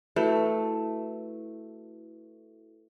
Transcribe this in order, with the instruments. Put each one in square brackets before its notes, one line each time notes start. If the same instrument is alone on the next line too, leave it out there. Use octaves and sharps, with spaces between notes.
[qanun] A3 [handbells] E4 F#4 B4